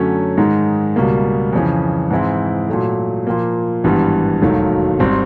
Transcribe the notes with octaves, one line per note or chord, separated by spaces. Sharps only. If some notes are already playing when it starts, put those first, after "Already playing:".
Already playing: F#2 D3 F#3 A3 C#4
G#2 D#3 G#3
C#2 B2 G3 A#3
F2 C#3 E3
G#2 E3 G#3 C4 E4
A#2 F#3 A3
A#2 F3 A#3
G#1 G2 E3 G3 B3
E1 D#2 D#3 F#3 A3
G#1 D#3 G3 C4